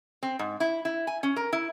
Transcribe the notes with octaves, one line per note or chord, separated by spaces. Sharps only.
C4
G#2
E4
E4
G#5
C#4
A#4
E4